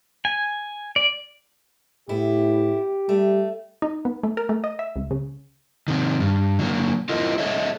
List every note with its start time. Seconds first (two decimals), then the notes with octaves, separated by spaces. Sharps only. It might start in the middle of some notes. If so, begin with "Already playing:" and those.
0.25 G#5
0.96 D5
2.09 A2 B3 E4 G4
3.09 G3 A3
3.82 D#4
4.05 B3
4.23 A3
4.37 A#4
4.49 A3
4.64 D#5
4.79 E5
4.96 C#2
5.11 C#3
5.88 C3 D#3
6.20 G2
6.59 D3 F#3 G3 A#3
7.09 E4 F4 A4 A#4 D#5
7.38 G#4 A4 C#5 D#5 E5